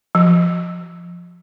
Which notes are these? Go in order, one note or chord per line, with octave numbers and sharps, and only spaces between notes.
F3